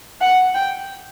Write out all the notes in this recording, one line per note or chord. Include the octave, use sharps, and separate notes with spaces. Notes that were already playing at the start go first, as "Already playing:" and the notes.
F#5
G5